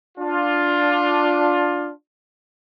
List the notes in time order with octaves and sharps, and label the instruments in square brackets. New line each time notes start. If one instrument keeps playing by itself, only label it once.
[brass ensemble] D4 F4